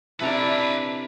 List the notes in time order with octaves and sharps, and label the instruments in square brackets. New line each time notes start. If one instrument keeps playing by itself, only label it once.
[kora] C3 A4 E5 [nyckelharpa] D4 E4 [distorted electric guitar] B4 A#5